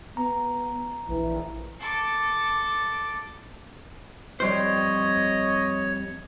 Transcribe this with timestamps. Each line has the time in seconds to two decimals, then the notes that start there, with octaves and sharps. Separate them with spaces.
0.17 B3 A#5
1.09 A#1 E3
1.79 A4 D6
4.40 F2 G3 C5 C#5 D#5